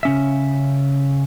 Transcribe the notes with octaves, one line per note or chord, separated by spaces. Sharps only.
C#3 C#4 E5